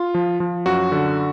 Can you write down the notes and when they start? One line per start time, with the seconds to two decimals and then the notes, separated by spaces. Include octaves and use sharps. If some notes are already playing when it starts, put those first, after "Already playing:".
Already playing: F4
0.14 F3
0.40 F3
0.66 F#2 F#4
0.92 D3